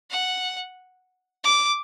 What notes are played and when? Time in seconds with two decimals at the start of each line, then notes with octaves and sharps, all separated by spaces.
0.10 F#5
1.44 D6